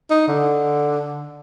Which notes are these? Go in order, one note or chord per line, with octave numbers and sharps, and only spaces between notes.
D#4
D3